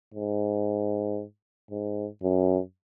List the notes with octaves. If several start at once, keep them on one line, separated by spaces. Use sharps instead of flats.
G#2
G#2
F#2